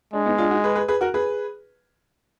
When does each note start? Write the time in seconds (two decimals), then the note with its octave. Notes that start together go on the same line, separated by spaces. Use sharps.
0.13 G#3 D4
0.25 B3 D#4
0.38 D4 F4
0.50 D#4 F#4
0.64 G#4 B4
0.75 G#4 B4
0.88 G#4 B4
1.01 F#4 A#4
1.14 G#4 B4